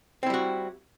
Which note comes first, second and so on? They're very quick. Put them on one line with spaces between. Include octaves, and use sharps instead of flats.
C4 E4 G3 F#4